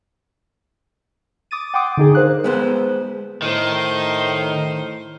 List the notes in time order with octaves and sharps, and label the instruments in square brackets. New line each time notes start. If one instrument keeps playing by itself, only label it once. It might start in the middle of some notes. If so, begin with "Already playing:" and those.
[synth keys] D6 D#6 A6 D#7
F#5 G5 C6 D6 D#6
D3 D#4 G#4
A#4 C5 F5 F#6
[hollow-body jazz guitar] G#3 B3 C5
[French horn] A2 [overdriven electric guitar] D#3 [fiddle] D#4 C5